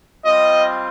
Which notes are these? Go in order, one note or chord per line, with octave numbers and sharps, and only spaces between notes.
G3 C4 F4 D#5